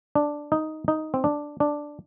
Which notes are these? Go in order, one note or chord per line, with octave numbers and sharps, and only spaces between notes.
D4
D#4
D#4
C4
D4
D4